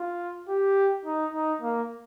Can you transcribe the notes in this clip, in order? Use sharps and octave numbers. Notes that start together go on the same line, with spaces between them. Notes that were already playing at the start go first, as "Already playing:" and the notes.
Already playing: F4
G4
D#4
D#4
A#3